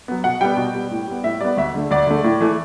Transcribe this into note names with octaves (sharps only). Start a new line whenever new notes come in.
F#3 B3
B2 F#5
G3 B3 G5
B2
G3 B3
A2
G3 B3
A2 E5
G3 B3 D5
D2 E5
D3 A3
D2 D5
D3 A3
A2
E3 A3